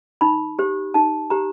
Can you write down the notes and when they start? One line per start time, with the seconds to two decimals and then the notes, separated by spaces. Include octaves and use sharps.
0.21 D#4 B5
0.59 G4 C5
0.94 D#4 A5
1.30 G4 C5 A#5